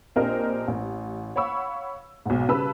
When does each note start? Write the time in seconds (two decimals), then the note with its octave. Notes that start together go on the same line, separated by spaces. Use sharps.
0.16 A#1 C4 D4 G4 A#4 D#5
0.68 A1
1.36 C#5 F5 F#5 B5 C#6 E6
2.26 B1 G#2
2.49 C#3 G3 B4 A5 B5 E6